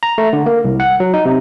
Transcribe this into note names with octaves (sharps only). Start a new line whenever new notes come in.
A#5
A3
D3
A#3
C2
F#5
F#3
D#4
C3